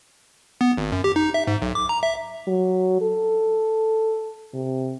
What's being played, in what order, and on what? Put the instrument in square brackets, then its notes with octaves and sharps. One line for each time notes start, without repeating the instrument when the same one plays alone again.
[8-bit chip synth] B3
G#1
F#2
G4
D#4
E5
G#2
B1
D6
A#5
E5
[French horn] F#3
A4
C3